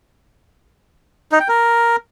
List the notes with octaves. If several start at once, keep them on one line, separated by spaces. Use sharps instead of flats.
D#4
G5
A#4